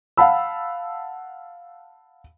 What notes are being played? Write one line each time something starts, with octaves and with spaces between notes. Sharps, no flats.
F5 F#5 A5 B5 E6